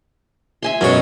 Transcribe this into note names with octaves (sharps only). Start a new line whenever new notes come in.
E5 G#5 C6
F#2 B2 F#3 G#3 C#5